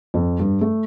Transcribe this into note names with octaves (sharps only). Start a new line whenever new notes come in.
F2
G2
A3